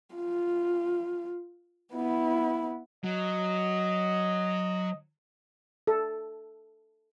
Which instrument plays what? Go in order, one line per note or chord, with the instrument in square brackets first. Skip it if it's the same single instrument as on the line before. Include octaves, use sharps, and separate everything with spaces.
[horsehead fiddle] F4
B3 E4
[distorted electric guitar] F#3 [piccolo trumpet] D#5
[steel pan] A4